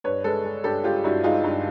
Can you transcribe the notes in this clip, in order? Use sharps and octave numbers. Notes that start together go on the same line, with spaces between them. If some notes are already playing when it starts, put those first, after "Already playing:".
G2 B4 C#5
G#3 A4 B4
G#3
G2 G4 A4
G#3 F4 G4
G2 E4 F#4
G#3 D#4 F4
G2